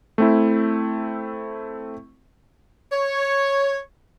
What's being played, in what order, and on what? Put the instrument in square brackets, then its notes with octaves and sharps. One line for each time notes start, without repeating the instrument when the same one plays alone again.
[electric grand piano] A3 C4 E4
[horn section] C#5